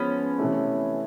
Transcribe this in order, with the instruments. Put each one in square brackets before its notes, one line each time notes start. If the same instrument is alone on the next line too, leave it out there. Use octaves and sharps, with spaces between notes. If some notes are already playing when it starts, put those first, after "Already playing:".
Already playing: [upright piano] F3 G#3 [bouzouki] B3 C#4
[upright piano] C3 E3 A3